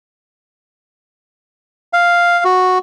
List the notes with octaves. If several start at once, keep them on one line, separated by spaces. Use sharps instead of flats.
F5
F#4